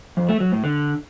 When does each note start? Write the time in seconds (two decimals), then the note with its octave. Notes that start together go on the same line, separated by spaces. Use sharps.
0.17 F2
0.29 A3
0.40 F#3
0.52 A2
0.64 D3